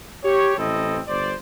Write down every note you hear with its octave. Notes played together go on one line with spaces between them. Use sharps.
G4 C#5
A1 C4 E4 A4 D#5
G1 C5 D5